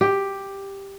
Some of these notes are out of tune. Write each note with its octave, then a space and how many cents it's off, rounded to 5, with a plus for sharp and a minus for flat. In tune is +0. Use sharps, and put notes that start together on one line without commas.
G4 +5